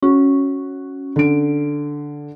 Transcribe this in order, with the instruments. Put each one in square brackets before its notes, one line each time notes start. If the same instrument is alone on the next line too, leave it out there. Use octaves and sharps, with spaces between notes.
[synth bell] C#4 [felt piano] F#4
[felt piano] D3 D7